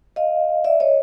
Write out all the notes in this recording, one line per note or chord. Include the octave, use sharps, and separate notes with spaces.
D#5 F5
D5 E5
C#5 D#5